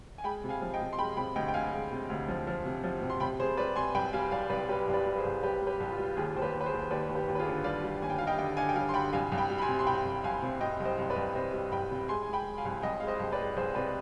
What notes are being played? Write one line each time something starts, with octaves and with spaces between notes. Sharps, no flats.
G#5
G#3 G5 B5
C3
F5 G#5
F3
D#5 G5
C3
C6
G#3 G5 B5
C3 G5 B5
D2 D#5 G5
G5
D2 F5 G#5
G#3
C3
D2
F3
F3
C3
F3
C3
C6
C3 G5 B5
C3 G#4 C5
G3 B4 D5
C3 G#5 C6
C2 G5 B5
G3 F5 G#5
C2 D5 F5
C2 B4 D5
G3 G4 B4
C2
B4 D5
G3
B4
G#4 C5
C2
C2 G4 B4
G3
G4 B4
C2 G4
F4
G3
D#2 F4 G#4
D#2 C5
G4 B4
D#2
B4
G#4 C5
D#2
D#2 B4 D5
D#2
G4 B4
D#2
B4
F4 G#4
D3
G3 D5 F5
G3
D#2 G#5
G5
G3 F5
D#5 G5
D3 D#5 G5
D3 F5 G#5
G5
G3 F5 G#5
C6
D3 G5 B5
C2 F5 G#5
C2
G5 B5
G3
B5
G#5 C6
C3
C6
C3 G5 B5
C2
C2 F5 G#5
C3
C3 D#5 G5
C2
C5 D#5
C2
B4 D5
C2
C3 C5 D#5
G3
C2 G5 B5
C3
G#3 G#5 C6
G#3 G#5
G5 B5
G#3
F5 G#5
C2
G#5
C2 D#5 G5
G#3 F5
C5 D#5
C2
B4 D5
G#3
C2 G#4 C5
C3 B4 D5